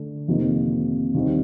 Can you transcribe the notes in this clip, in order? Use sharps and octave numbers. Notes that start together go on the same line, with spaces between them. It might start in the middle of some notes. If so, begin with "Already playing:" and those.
Already playing: D3 A3 D4
F2 C3 D#3 A#3
D#2 D#3 G3 C4